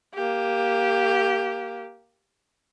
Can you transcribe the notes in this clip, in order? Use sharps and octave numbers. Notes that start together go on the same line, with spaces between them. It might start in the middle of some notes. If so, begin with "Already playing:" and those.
A#3 G4